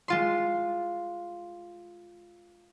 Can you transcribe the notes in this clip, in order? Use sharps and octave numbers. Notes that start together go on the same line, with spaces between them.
G#3 F4 C6